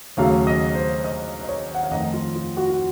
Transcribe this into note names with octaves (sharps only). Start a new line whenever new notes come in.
D#2 C#3 F#3 A3 F5
D#5
C5
D#5
D#5
C#5
F#5
F5
F2 D#3 A3 D#5
F4
F4
F#4
F4